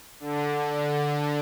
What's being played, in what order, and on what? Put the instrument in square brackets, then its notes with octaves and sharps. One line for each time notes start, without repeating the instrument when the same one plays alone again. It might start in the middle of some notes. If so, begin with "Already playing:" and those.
[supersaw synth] D3